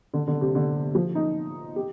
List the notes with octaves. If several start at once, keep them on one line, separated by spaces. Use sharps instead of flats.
D3
D3
C3
D3
F3
D#4
G4